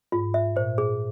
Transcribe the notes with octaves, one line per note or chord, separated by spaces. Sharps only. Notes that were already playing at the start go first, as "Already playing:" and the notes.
G#2 F4
E5
A#2 C5
G#4